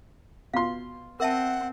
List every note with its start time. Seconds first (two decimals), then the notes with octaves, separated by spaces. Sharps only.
0.54 B2 F4 F5 C6
1.20 C4 A#4 E5 F#5 A5